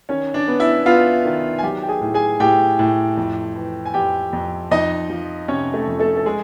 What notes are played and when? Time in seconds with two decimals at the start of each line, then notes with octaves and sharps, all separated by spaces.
0.09 D#3 C#4 C#5
0.34 D4 D5
0.48 B3
0.60 E4 E5
0.86 B3 F4 F5
1.25 D#3
1.58 G#5
1.63 F#3 G4 G5
1.83 G5
1.89 G#4 G#5
2.01 A2
2.14 G#4 G#5
2.40 A2 G4 G5
2.79 A2
3.17 F2
3.56 E3
3.86 G#5
3.94 F2 G4 G5
4.33 F2
4.71 F2 D#4 D#5
5.10 F3
5.48 C3 C#4 C#5
5.74 A3 A4
5.87 F2
5.99 A3 A4
6.17 A4
6.26 G#3 G#4